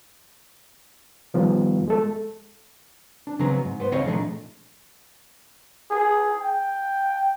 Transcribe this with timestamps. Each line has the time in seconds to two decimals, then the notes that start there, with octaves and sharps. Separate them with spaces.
1.34 D#3 F3 G3 B3 F4
1.88 G#3 A4
3.27 D4
3.39 C#3 F#3 B3 C4 A#5
3.65 G#2
3.80 B3 C5
3.92 C#2 C4 C5 C#5 D#5 F5
4.05 A#2 F3 G#3 A3 D4 D#4
5.90 G#4
6.40 G5